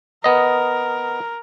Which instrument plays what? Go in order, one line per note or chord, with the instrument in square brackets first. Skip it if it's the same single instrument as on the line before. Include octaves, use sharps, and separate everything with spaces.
[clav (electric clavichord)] B3 D#5 [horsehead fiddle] A#4